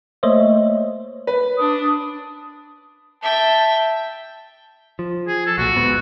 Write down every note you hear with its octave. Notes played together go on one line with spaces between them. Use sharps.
A3 A#3 C5 C#5 D#5 E5
B4
D4 D#6
E5 G5 A5
F3
G#4
A4
B1 A#2 F#4
D1 G#2 B3